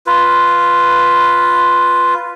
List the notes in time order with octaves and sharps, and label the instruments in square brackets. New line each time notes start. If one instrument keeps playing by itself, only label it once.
[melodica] F4 B4